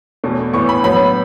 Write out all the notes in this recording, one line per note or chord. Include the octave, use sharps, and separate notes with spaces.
E2 B2 A3
A2 E3 B3 C#6
B5
A2 F#3 B3 B5